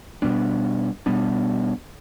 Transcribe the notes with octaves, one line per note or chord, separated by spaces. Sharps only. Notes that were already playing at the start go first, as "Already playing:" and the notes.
B2 G3 B3 D4
B2 G3 B3 D4